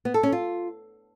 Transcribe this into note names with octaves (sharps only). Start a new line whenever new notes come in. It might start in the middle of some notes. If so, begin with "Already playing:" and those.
B3
A4
C#4
F4